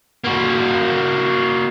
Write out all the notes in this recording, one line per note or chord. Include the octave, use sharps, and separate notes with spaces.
A#3 F#4